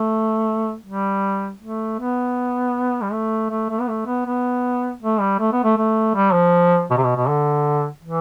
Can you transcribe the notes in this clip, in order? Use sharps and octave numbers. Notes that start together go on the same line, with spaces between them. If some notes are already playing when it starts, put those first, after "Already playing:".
Already playing: A3
G3
A3
B3
G3
A3
A3
A3
B3
A3
B3
B3
A3
G3
A3
B3
A3
A3
G3
F3
B2
C3
B2
B2
D3
E3